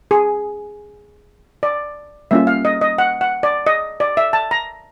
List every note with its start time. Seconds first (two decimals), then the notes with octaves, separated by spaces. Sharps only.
0.11 G#4
1.63 D5
2.31 G3 A#3 C#4 F4 E5
2.47 F5
2.65 D#5
2.81 D#5
2.98 F#5
3.21 F#5
3.43 D5
3.67 D#5
4.00 D5
4.17 E5
4.33 A5
4.51 A#5